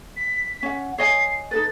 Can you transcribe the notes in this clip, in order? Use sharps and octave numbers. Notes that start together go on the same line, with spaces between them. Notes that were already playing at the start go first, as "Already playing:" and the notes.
B6
C#4 F#5
C#5 D#5 G#5 C7
D#4 A4 B4 A6